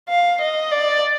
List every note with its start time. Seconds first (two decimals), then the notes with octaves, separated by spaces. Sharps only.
0.09 F5
0.41 D#5
0.71 D5